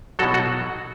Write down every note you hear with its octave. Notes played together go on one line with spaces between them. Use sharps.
B2 F#3 F#4 A4
F#4 A4